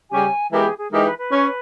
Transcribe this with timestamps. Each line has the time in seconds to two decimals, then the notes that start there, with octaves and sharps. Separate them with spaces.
0.10 C#3 G3 C#4 G4 G#5
0.50 E3 G#3 B3 G4 A#4
0.65 G#4
0.78 G#4
0.91 E3 G#3 D#4 G4 A#4
1.05 B4
1.18 B4
1.31 C#4